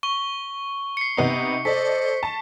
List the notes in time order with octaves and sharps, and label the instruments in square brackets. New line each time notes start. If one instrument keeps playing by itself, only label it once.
[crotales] C#6 G7
C7 C#7
[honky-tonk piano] C3 B3 D#4
[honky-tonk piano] A4 D5 D#5 [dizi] C5 [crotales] B6
[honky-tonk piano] A5